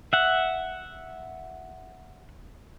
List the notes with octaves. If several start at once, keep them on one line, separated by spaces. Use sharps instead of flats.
E5 F#5